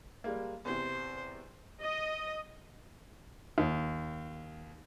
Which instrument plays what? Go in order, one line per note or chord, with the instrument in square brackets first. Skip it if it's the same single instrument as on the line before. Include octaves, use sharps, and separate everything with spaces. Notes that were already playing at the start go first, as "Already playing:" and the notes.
[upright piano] G3 G#3 A#3
[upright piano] E2 C3 [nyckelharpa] C5
[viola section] D#5
[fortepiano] D#2